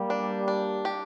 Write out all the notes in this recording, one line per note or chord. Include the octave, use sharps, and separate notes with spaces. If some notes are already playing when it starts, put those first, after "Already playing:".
Already playing: G3 A#3
D4
D4
G4